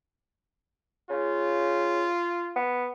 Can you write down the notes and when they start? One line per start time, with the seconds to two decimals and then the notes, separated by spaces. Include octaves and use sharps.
1.10 C#3 F4
2.56 B3